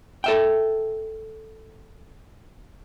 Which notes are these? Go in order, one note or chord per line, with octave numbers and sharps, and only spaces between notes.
A4 E5 G5